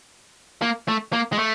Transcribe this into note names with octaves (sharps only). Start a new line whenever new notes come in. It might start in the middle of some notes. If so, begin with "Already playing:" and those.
A#3
A3
A#3
G#3
A3